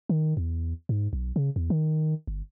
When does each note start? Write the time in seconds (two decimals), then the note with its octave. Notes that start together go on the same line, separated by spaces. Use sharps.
0.09 D#3
0.37 E2
0.89 G#2
1.13 B1
1.36 C#3
1.56 E2
1.70 D#3
2.27 G1